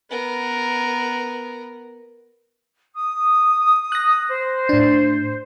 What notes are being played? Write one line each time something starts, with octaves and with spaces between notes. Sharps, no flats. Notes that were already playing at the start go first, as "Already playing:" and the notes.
B3 A#4
D#6
F#6 A#6
C5
A2 D4